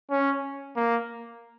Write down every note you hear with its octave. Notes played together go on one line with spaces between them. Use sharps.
C#4
A#3